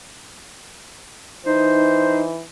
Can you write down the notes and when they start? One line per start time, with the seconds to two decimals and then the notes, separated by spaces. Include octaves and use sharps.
1.46 E3 D#4 C5